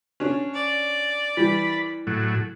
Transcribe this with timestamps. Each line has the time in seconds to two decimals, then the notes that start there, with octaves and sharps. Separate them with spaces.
0.20 C#4 D4
0.54 D5
1.37 E3 G3 B5
2.07 A2 F#3